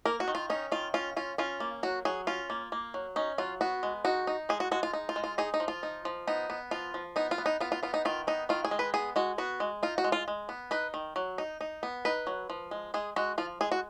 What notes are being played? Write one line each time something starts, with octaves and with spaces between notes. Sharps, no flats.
A#3 A#4
F#4
D#3
F4
C#4 D#4
D#3 F4
C#4 F4
C#4 F4
C#4 F4
A#3
F#3 F#4
F#3 G#4
C#4 F4
A#3
A#3
F#3
C#4 D#4
F#3 F4
B3 F#4
G#3
D#4 F#4
D#4
G#3 G#4
F#4
G#3 F#4
F4
D#4
F4
G#3
F4
D#4 G#4
D#4
F3
F4
D#4
F3
B3 D#4
B3
F3 F4
F3
B3 D#4
F4
B3
D#4
B3 F4
F4
B3 F4
D#4
D#3 F4
B3 D#4
D#3 F4
G#4
G#3
B4
B3 G#4
G#3 F#4
B3 F#4
G#3
D#4 F4
F#4
G#3
F4
G#3
B3
D#4 B4
D#3
F#3
D#4
D#4
B3
D#4 B4
F#3
F3
G#3
G#3 G#4
G#3 F#4
F3 F4
G#3 G#4
F#4